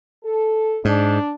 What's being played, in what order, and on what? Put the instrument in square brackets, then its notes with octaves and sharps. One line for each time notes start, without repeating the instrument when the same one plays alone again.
[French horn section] A4
[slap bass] G#2 [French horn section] D4